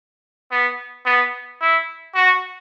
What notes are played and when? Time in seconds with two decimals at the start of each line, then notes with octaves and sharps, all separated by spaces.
0.51 B3
1.06 B3
1.61 E4
2.15 F#4